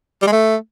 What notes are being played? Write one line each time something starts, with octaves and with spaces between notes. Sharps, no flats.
G3
G#3
A3